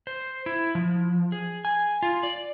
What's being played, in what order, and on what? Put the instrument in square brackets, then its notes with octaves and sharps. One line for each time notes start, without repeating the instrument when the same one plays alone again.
[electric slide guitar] C5
E4
F3
G#4
G#5
F4
D5